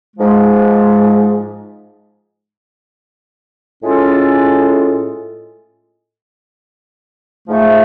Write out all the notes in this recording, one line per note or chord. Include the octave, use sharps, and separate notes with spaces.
G#2 F3 G#3
A2 G#3 C#4 F4 A4
G#2 F3 A3